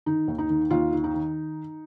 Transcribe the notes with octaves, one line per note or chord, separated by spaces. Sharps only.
D#3 D#4
D#2
D#4
D#3
D#2 F4
D#3
D#4
D#3